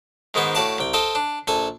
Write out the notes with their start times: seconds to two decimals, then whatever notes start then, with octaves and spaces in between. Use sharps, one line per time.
0.34 G#2 D#3 G#3 B3 C5
0.55 A2 F#4 D5 F5 A5 D6
0.78 C2 G5
0.93 A4 C5 D#5 F5 G5
1.15 D4
1.47 A#1 A4 G#5